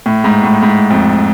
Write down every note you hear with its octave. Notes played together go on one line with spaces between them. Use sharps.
A2
G#2
A2
G#2
F2